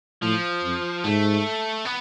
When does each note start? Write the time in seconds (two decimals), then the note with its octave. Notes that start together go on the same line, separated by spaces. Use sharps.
0.22 A2 F3
0.63 F2
1.04 G#2 A3
1.85 B3